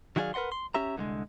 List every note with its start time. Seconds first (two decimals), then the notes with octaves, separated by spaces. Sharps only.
0.16 D#3 F#3 E4 G#4 D5 F5
0.34 A#4 B4 D#5 F#5 C6
0.52 C6
0.75 C#4 G4 E5 A#5
0.96 C2 D3 F3 G#3